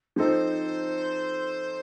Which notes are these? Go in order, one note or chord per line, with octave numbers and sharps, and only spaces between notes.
F3 C4 D#4 A4 C5